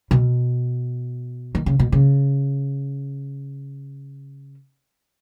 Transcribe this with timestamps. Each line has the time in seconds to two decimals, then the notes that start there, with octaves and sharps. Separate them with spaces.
0.11 B2
1.55 D#3
1.66 C#3
1.79 B2
1.92 C#3